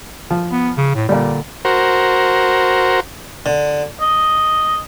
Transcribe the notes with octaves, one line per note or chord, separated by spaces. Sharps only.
F3
B3
C#3
A2
A#2 D3 G3
F#4 A#4 C5
D3
D#5